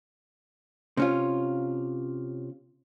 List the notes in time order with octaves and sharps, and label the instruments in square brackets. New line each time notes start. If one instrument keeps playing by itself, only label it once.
[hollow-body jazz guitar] C3 C#4 F4